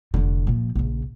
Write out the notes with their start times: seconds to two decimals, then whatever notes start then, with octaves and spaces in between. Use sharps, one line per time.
0.14 F1 D3
0.47 A#2 F3
0.75 A#1 C#3